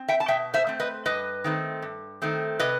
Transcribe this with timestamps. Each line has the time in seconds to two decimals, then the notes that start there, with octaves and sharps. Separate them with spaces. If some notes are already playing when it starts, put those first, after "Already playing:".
Already playing: C4
0.08 E5 G5
0.20 A5
0.28 B2 E5 G5
0.54 C5 E5
0.67 A3 C4
0.80 B4 D#5
1.05 G2 B4 D#5
1.44 D#3 A3 C4
1.82 G2
2.22 D#3 A3 C4
2.60 C3 B4 D#5